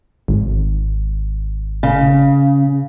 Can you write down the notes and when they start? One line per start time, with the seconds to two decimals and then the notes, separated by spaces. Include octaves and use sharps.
0.28 G#1
1.83 C#3